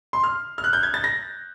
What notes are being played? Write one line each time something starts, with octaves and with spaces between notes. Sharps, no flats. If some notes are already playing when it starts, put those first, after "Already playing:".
C6
F6
F6
F#6
G6
G#6
A6
A#6